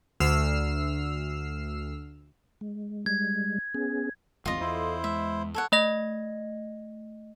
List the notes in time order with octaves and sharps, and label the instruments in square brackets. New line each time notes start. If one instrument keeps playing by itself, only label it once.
[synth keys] D2 E6 F6 C7
[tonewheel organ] G#3
[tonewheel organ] G3 G#3 [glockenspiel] G#6
[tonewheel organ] B3 C#4 G#4
[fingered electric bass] G1 E2 C4 [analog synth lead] G#3 [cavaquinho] F4 D#5
[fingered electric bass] E2 [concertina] E4 C5 [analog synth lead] A4
[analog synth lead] G#3 [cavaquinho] E5
[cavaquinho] A4 C#5 F#5
[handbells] A3 D#5 A#6